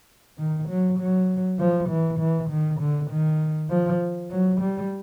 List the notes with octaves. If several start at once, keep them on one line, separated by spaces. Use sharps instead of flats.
D#3
F#3
F#3
F3
E3
E3
D#3
D3
D#3
F3
F#3
G3